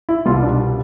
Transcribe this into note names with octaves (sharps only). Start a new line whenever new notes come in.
E4
C2 B2 G3 F4
D4